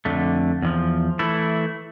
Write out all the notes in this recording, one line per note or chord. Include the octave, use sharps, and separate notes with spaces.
F2 D3 A3
E2 D3 F3
E3 A3 E4